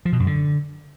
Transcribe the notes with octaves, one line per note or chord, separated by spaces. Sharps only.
F3
B2
F#2
D3